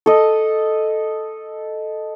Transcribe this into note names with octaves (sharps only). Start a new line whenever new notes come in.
A4 D#5